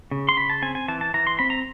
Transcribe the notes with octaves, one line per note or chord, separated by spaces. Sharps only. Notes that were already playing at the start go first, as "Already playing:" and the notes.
C#3
C6
C#3 B5
A5
C4 G#5
G#5
E3 A5
A5
E3 A#5
C6
C4 B5
A#5